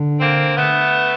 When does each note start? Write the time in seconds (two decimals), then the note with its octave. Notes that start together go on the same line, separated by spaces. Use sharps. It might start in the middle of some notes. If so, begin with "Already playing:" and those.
Already playing: D3
0.20 A#3 C4
0.57 A3 B3